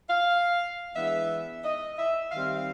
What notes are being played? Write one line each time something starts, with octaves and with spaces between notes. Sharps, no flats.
F5
E3 G#3 B3 D4 E5
D#5
E5
D#3 G3 C4 F5
F5